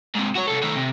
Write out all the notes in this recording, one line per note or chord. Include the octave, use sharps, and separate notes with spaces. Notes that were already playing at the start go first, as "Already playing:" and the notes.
G#2 C3
F#4 C#5
C3 A4
D#3 A3
C3